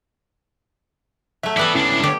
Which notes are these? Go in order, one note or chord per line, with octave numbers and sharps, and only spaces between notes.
F#3 A3 E5
G3 B3 E4 A4 B4
C#2 C#4 D4 E4
D3 G4 C#5